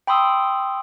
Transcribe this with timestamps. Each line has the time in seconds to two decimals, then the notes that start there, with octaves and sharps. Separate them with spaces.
0.07 G5 B5 C6 D#6 E6